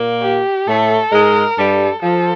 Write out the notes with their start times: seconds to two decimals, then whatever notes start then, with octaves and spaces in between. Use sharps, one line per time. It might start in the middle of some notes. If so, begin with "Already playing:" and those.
Already playing: A#2 A#3
0.22 G4
0.67 A2 A3 A4
1.12 G#2 G#3 A#4
1.58 G2 G3 A4
2.03 F3 A4